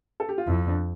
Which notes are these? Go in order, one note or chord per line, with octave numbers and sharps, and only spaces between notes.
A4
G4
F4
F2 E4
D4